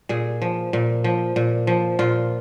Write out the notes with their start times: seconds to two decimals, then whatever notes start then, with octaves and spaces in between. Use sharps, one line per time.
0.09 A#2 G#4
0.42 F3
0.73 A#2
1.04 F3
1.36 A#2
1.67 F3
1.99 A#2 F4